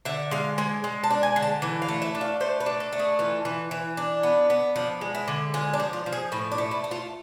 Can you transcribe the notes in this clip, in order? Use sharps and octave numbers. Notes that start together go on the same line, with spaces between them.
D3 E5
G#3 F5
G#3 G#5
G#3
A5
D4
G#5
D3
A5
E3 G#5
F5
A3
E5
D4
F5
A3 C5
B4
D4
A4
A3
G#4
E3 F4
E3
E3
D4
B3
B3
F3 D4
G#3
E4
D3
G#3 F4
D4
F3
F4
F3
G#4
A2 E4
D4
A3
E4
A3
F4